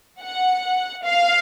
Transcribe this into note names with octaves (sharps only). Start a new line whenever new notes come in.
F#5
F5